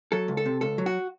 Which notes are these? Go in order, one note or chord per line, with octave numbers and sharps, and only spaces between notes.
F#3 A4
C#2
A4
C3
C#2 A4
F#3
F#4